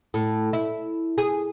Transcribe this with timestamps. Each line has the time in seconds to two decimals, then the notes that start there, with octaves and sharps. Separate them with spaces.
0.14 A2
0.53 E4
1.18 G#4